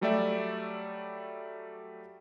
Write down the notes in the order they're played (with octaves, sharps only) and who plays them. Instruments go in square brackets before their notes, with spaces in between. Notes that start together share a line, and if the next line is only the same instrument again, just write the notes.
[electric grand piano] F#3 G3 A3 G4 D5 E5